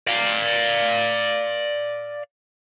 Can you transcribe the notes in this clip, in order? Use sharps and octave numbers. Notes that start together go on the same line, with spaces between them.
D5 F5